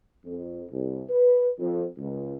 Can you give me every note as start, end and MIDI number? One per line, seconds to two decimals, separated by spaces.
0.25 0.65 41
0.70 1.02 36
1.10 1.49 71
1.59 1.85 41
1.98 2.36 37